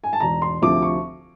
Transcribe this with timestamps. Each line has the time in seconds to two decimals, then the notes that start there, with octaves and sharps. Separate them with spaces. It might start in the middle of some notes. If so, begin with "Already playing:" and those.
0.04 G#5
0.13 A5
0.20 E1 A#5
0.42 C6
0.62 D2 C3 F3 D6
0.82 C#6